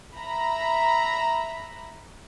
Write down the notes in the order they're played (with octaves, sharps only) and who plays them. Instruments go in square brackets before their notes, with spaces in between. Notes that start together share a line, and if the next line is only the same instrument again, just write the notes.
[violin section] E5 A#5 B5